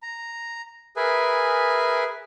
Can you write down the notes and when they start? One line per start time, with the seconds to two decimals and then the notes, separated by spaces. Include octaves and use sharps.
0.03 A#5
0.96 G#4 A#4 B4 E5 G#5